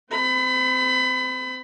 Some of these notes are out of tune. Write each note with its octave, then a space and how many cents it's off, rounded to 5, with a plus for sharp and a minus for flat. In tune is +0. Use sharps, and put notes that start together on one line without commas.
C4 -25 B5 +30